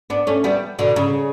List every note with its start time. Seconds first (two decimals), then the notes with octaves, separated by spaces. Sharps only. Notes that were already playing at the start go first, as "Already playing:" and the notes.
0.10 B3 D4
0.27 A3 C#4
0.44 G3 B3
0.79 B2 D3
0.96 C#3